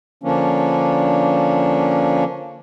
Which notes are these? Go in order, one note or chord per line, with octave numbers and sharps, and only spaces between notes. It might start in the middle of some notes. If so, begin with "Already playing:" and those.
D3 F3 A#3 C#4 D4